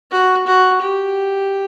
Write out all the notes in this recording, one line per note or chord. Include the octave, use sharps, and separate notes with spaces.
F#4
F#4
G4